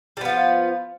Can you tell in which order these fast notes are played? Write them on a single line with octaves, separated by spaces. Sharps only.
G3 B3 F3 F4